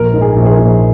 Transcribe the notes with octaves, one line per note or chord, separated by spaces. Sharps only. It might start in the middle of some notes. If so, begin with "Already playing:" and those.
Already playing: A#1 A#4
G#2
G#4
A#1
G#4
A#4
A#1